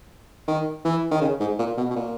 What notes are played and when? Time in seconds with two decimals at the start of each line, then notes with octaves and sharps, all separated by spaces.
0.48 D#3
0.85 E3
1.11 D#3
1.21 C#3
1.40 G#2
1.59 A#2
1.77 B2
1.90 B2
1.96 A#2